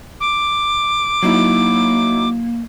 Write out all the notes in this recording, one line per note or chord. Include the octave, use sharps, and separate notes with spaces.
D6
F#3 A#3 D#4 E4